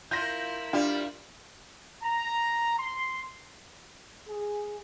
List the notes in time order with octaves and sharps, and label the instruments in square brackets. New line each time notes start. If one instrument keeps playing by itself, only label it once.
[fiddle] E4 A#4 [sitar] F4 [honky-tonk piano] G6 A#6
[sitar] G3 [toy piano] D4 [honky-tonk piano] F4
[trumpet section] A#5
C6
[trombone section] G#4